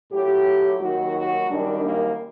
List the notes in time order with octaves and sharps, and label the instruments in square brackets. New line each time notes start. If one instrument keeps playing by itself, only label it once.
[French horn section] A2 F#3 G4
D#2 D#3 F#3 F#4
F#4
F#2 D#3 G3 D4
A#3